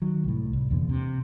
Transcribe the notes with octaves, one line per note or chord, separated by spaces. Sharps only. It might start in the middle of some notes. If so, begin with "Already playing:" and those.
D#3 F#3
C2 A2
C2
F1 E2 A#2 D3
C3